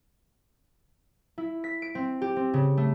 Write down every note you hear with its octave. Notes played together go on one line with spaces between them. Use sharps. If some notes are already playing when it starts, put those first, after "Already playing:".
E4
B6
D7
C4
G4
C4
C#3
A3